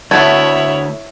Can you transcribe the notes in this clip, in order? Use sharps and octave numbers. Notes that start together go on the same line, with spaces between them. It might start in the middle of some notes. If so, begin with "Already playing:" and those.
D2 A3 B3 E4 C#5 G#6 A6